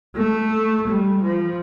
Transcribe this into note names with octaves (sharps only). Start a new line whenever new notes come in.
A3
G3
F3